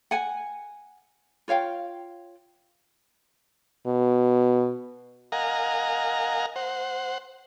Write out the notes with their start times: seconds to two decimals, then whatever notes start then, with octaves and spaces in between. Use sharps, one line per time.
0.11 F#5 G#5
1.48 F4 C#5 F5 G5
3.86 B2
5.32 A#4 D#5 F5 F#5 G#5 A#5
6.56 C5 F#5